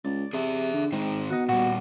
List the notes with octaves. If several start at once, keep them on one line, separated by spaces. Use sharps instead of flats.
C#2 D5
C3 G#4 E5
D3
G#2 D#3 C4 C5
B2 D#4 F#5
A#2 G3 F#4